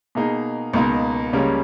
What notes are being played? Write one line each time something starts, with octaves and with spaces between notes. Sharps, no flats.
B2 A#3 D#4 G#4
C#2 B2 A#3 D#4
C#2 C#3 G3 A#3 C#4